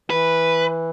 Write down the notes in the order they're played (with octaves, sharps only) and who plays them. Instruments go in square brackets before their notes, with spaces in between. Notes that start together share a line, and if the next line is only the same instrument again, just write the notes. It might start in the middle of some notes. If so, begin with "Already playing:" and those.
[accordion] E3 [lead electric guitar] B4